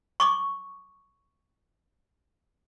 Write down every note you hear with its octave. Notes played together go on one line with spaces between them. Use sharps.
C#6 D6